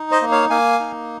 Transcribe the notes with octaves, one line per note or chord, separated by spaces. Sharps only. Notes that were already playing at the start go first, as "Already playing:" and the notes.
Already playing: D#4
C5 D#5
A#3
C#5 F5
A#3 F5 G#5
D#4